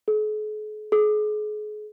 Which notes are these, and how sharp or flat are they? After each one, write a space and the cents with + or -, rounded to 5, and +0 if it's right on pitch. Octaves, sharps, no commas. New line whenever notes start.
G#4 +45
G#4 +35